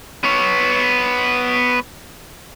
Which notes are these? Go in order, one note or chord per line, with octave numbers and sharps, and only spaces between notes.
B3 C#5